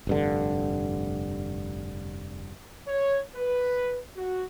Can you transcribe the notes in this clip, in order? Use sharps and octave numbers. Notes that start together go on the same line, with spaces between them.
F1 G2 D3
C#5
B4
F#4